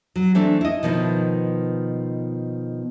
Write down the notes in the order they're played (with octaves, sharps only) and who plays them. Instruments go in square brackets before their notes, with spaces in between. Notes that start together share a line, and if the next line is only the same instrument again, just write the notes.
[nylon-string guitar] F#3
E3 A3 C4 D4
E4 D#5
B2 D#3 F3 B3